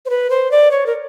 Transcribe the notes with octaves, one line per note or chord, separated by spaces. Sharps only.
C5
B4
C5
D5
C#5
A#4